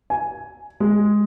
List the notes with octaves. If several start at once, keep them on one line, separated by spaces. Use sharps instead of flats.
G#5
G#3